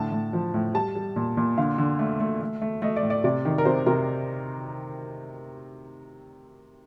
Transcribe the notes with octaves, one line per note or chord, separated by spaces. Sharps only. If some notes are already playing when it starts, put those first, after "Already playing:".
Already playing: A2 D3 A5
A2
F3
A2
G3 A5
G3
A#2
A#2
D3 F5
D3
A3
A3
A3
A3
A3 D#5
D5
A2
D5
C3 D5
D#3
A#4
C3 C5
C3 A#4